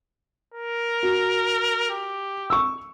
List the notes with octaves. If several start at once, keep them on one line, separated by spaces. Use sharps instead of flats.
A#4
F#4
G4
C#6 E6